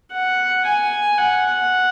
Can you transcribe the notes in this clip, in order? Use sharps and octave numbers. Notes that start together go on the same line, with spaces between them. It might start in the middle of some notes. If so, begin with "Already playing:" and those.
F#5
G#5
F#5